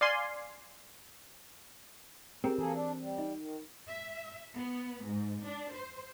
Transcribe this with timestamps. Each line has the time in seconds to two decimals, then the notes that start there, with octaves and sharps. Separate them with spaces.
0.01 D5 F5 G#5 C6
2.44 C4 G4 G#4 A#4
2.58 E3 A#3 G#4 A4
2.73 D4
3.01 G3
3.18 D#4
3.37 D#3
3.87 E5
4.54 B3
5.05 G#2
5.44 D4
5.73 C5